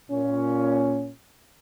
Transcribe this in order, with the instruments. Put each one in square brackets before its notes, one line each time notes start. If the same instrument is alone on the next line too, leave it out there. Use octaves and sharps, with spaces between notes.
[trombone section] A#2 C#4